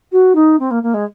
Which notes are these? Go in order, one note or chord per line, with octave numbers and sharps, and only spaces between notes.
F#4
D#4
C4
A#3
A#3
G#3